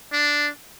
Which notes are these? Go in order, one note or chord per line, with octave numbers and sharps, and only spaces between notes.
D4